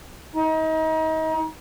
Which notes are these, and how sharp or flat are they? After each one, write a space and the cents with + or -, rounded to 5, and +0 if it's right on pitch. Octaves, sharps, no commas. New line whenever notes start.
D#4 +35